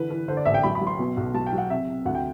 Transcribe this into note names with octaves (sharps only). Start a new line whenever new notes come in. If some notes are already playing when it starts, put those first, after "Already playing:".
Already playing: D3 E3 B4
E3
D3 C5
D5
A1 E5
G5
F#3 B5
B5
F#3
C6
B2
B1
F#3 A5
G5
F#3
F#5
C3 E5
C3
D2 F#5
G5